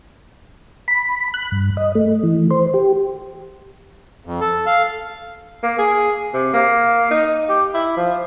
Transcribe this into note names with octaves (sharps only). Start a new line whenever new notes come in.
B5
F#6
G2
D#5
A3
E3
C5
G4
F2
A4
F5
A#3
G#4
C3
A#3
D#4
G4
E4
F3